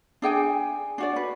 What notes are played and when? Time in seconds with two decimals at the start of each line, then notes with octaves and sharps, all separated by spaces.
0.22 D4 G#4 G5 G#5
0.98 D4 F#4 D5
1.16 B4